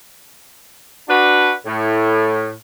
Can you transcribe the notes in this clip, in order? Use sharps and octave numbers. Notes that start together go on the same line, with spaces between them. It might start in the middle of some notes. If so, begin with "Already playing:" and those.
D4 F#4 B4
A2